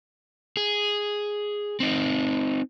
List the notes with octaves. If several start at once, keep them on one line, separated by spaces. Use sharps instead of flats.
G#4
C4 D#4